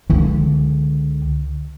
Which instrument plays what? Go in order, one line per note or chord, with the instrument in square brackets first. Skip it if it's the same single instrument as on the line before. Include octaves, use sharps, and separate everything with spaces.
[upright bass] C#2 D3